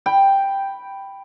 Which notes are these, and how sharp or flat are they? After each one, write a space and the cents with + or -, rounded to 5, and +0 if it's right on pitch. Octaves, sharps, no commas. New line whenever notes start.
G5 +0 B5 +0